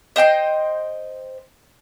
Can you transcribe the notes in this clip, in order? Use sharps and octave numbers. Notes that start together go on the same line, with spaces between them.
C5 D#5 G5 C6